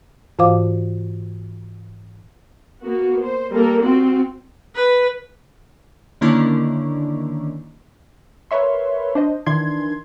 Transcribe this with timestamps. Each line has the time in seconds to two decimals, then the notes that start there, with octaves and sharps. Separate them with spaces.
0.39 G#2 E3 F4 C5 F5 D6
2.81 A#3 B3 F#4
3.21 C5
3.51 G3 A#3 A4 A#4
3.82 C4 F4 F#4
4.75 B4
6.21 D3 D#3 A#3 C#4 D4 E4
8.51 A#4 B4 C#5 E5 C6
9.15 D4 C5 D#5
9.46 D#3 E3 D4 C6 G#6